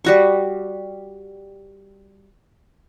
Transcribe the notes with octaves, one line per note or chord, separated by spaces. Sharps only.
G3 F#4 C#6